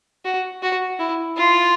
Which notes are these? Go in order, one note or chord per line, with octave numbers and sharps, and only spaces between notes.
F#4
F#4
E4
F4